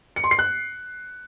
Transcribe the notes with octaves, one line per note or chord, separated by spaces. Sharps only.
C#7
C6
C7
F#6